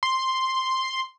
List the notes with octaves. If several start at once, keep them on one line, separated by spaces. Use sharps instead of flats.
C6